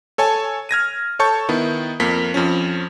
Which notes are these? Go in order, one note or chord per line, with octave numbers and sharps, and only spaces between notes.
A4 C#5 G#5 A5
F6 G#6 A#6 D#7
A4 C#5 A5 C#6 G6
D#3 B3 E4
F2 A#3 B6
F2 F3 C#4